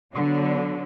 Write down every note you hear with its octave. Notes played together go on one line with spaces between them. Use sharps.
D3 F#3 B3